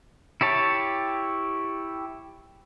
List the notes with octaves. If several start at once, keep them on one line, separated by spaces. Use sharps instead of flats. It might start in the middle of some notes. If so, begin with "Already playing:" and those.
E4 G4 C#5 A5